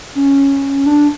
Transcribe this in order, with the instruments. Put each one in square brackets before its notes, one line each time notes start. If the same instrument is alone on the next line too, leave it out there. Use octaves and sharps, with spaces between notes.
[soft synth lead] C#4
D4